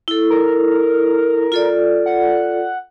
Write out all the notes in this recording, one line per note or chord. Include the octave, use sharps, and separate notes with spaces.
E4 A4
A#4
F4 A4 D5
F#5